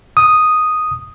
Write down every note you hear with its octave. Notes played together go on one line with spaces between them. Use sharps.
D#6